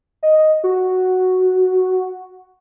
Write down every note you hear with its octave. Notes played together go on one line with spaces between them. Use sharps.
D#5
F#4